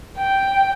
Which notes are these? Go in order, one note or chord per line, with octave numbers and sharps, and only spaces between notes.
G5